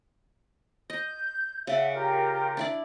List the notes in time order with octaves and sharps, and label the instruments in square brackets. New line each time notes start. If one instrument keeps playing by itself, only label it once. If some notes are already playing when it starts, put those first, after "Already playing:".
[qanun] D#5 [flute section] G6
[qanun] C#3 D5 [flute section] E5 F#5
[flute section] F4 G4 A#4
[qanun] D4 E4 D5